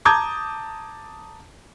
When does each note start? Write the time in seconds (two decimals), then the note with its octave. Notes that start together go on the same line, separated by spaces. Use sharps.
0.05 A5 A#5 D6 D#6 G6 G#6